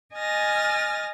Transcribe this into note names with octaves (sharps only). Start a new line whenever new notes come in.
D#5 G#5 F6 A6 A#6